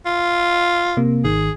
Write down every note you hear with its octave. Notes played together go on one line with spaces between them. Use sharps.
F4
C3 A#3
G#1 D#3 G#4